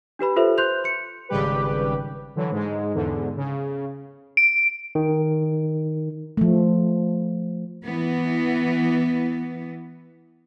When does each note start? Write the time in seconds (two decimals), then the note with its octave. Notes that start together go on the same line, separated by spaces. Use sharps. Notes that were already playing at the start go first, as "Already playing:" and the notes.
0.19 D4 G4 B4 B5
0.36 F4 G4 A4 B4 C5 E5
0.58 C5 C6 F#6 G6 F7
0.84 C6 C#7
1.29 G#1 C#3 G3 G4 B4
2.36 D3 E3 F#3
2.51 G#2 G#3
2.94 E2 G#2 D3
3.37 C#3
4.37 D7
4.95 D#3
6.37 F3 A3
7.84 E3 B3